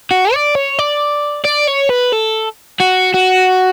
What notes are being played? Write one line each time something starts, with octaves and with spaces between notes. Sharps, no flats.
F#4
D5
C#5
D5
D5
C#5
B4
A4
F#4
F#4